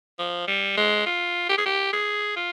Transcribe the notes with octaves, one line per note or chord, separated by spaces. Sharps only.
F3
G3
G#3
F4
G4
G#4
G4
G#4
F4